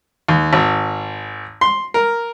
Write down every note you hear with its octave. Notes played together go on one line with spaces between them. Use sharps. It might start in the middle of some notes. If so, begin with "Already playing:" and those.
D#2
G#1
C6
A#4